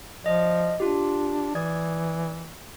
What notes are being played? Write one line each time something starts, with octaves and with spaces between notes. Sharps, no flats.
F3 D5 D#5
D4 F4 G4
E3 D5 D#6 G#6